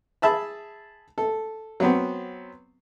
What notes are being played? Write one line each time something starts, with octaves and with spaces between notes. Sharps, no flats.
G#4 E5 A5 B5
A4
F#3 B3 C4